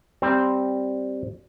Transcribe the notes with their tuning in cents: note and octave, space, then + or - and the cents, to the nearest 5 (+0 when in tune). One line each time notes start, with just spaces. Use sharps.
G3 +0 C4 +0 A#5 +0